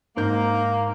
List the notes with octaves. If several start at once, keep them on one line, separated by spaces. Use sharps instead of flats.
G#2 A#3 D#4 G6